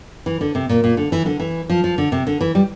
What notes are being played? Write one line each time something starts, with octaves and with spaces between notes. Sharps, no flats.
E3
D3
C3
A#2
A#2
D3
E3
D3
E3
F3
F3
D3
C3
D3
E3
G3